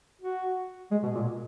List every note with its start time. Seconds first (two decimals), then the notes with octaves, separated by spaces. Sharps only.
0.21 F#4
0.91 G#3
1.03 B2
1.15 A#2